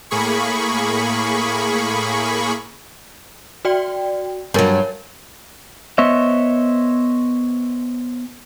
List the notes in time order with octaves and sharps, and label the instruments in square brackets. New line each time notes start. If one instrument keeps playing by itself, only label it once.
[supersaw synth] A2 A#3 G#4 B5 C#6
[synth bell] F#4 D5 G5
[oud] G2 F#3 [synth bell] A#4 C#5
[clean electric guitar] B3 C5 C#5 D#5 E5